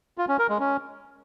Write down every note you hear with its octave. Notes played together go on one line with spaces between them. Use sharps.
F4
C#4
A#4
G#3
C#4